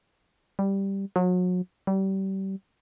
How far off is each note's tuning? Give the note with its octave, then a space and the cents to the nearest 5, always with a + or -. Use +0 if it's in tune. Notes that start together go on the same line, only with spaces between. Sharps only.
G3 +0
F#3 -35
G3 -30